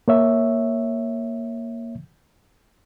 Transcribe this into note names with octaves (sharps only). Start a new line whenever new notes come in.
A#3 C#5 E5